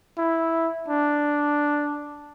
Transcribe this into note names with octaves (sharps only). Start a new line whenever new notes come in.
E4
D4